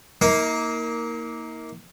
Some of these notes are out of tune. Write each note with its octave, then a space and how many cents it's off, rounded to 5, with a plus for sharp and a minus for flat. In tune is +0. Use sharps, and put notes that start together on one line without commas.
A#3 +0 D#4 +45